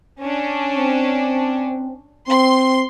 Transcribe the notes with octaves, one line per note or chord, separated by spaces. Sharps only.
C#4 D4
C4
C4 C6